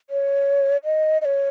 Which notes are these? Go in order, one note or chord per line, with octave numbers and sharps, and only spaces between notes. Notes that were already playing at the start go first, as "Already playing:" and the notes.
C#5
D#5
D#5
C#5